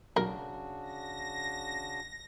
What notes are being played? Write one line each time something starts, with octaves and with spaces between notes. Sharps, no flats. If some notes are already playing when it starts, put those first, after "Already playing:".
B1 C#3 D4 F#4 A#4
A#6